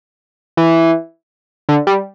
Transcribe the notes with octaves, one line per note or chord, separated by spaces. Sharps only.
E3
D3
G3